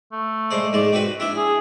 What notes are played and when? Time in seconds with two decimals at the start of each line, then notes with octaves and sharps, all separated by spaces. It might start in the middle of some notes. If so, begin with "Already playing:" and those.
0.12 A3
0.51 G#3 C5 D5
0.73 G#2 G#3 D5
0.92 C4 F#4 B4
1.20 D4 E4 E5
1.36 G#4